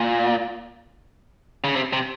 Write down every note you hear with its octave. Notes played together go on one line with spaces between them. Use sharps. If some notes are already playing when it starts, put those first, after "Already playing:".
Already playing: A#2
C#3
C3
C3